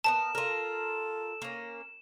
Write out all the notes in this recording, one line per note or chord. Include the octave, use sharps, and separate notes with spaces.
B3 C4 A#4 A5 E7
F4 A4 A#4
A#3 C#4